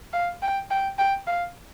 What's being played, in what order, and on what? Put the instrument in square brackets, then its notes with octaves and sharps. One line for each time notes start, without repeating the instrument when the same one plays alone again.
[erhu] F5
G5
G5
G5
F5